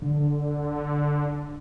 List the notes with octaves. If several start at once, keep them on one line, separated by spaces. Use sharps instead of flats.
D3